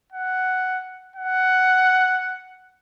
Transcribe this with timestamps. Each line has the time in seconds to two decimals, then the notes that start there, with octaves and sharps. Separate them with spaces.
0.12 F#5
1.16 F#5